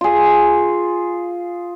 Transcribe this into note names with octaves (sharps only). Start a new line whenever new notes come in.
F4 G#4